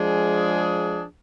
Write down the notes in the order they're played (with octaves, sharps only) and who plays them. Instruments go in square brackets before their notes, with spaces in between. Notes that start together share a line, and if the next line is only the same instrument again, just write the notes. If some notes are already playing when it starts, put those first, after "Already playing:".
Already playing: [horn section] F3 G#3 D4 G#4